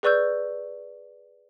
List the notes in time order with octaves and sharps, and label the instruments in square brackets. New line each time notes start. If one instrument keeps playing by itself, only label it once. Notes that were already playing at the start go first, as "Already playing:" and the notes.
[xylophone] G#4 B4 D5 C#6 E6 G6